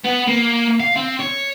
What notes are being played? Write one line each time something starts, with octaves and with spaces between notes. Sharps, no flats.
B3
A#3
F5
C4
C#5